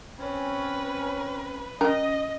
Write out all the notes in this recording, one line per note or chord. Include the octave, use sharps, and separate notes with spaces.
C4 C#4 B4
C#4 A#4 D#5